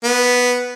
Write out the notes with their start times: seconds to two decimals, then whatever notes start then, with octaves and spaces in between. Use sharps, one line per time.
0.04 B3